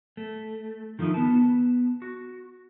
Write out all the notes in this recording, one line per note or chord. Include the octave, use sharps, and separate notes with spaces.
A3
D#3 F3 F#3 D#4 E4
B3 A5
F#4